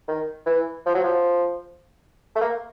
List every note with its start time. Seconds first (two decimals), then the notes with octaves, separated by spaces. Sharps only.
0.08 D#3
0.46 E3
0.86 F3
0.95 F#3
1.04 F3
2.36 A3
2.41 A#3